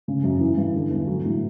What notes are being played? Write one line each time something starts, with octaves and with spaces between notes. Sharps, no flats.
C#3
F#2
E3
G2
D3
E2
F#3
A2